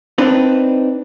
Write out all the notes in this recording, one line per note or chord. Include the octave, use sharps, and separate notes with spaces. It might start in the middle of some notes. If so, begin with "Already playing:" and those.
C4 D4 D#4 B4